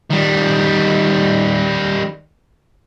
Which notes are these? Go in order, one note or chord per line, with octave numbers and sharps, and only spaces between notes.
D#3 G3